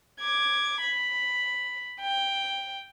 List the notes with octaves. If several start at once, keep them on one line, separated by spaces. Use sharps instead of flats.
D6 G#6
B5
G5